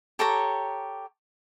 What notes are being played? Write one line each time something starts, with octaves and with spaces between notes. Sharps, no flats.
G4 A4 C#5 A#5